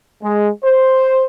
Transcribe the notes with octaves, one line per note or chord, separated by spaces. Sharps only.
G#3
C5